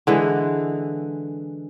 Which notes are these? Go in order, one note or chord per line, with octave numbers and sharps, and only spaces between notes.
D3 E3 G#3